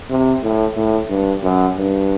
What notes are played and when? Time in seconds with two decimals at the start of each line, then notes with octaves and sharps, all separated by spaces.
0.10 C3
0.42 A2
0.76 A2
1.10 G2
1.43 F#2
1.77 G2